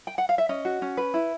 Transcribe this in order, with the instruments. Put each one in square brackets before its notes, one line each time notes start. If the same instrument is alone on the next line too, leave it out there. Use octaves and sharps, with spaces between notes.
[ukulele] G5
F#5
F5
E5
C#4 D#5
F#4
C#4
B4
E4